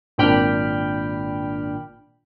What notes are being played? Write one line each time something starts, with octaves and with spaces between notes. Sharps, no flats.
G#1 A#2 D4 G5 B5 F6